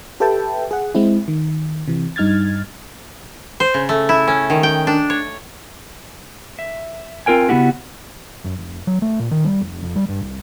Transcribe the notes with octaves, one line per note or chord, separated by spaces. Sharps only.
G4 A4 B4 E5 G5 A5
G#4 F#5
G#3 C4 E4
D#3
C3 E3
G2 D#4 F6 G#6 A6
C5
C#3
A3
E4
C#4
D#3
G5
D4
C#5
E5
C4 F4 A#4 G5 G#5
C#3 B3 E4 F#4 G4
F#2
F1
F#3
A3
A#2
D#3
G3
F1
F2
G3
G2
C2